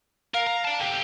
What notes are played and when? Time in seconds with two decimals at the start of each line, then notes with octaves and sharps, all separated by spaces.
0.34 A#4 F5
0.47 A#5
0.65 D5 A5
0.81 D3 G4 G5